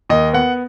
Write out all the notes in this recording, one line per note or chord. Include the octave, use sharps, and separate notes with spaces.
D#2 D#5
B3 F#5